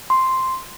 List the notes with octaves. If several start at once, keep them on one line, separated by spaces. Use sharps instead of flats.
C6